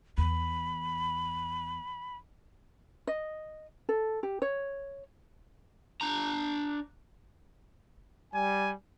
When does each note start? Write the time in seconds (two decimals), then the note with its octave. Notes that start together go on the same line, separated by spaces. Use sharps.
0.18 E2 B5
3.07 D#5
3.89 A4
4.23 G4
4.42 C#5
6.01 D4 A#5
8.34 G3 G#5